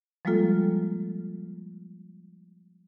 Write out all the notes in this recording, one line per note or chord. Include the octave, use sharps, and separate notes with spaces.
F3 G3 G#3 A#3 F4 A4